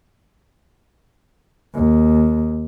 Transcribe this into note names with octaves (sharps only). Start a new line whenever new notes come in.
D#2